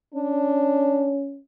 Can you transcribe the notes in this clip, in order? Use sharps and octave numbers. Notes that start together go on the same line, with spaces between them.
C#4 D4